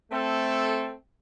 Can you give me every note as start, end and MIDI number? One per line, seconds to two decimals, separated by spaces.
0.11 0.91 57
0.11 0.91 60
0.11 0.91 69